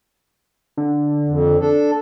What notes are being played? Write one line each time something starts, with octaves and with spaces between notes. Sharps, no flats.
D3
F2
D4 A4